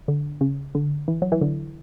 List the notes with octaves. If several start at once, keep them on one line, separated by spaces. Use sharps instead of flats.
D3
C#3
D3
E3
F#3
E3
D3